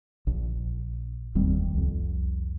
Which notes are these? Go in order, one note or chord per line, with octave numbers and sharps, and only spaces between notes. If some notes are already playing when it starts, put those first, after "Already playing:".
A#1
F1 D#2 G3 C4
C2 F2